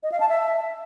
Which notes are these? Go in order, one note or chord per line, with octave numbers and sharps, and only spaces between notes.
D#5
F5
A5
E5